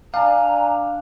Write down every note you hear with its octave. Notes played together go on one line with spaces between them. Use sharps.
D4 F5 G#5 A#5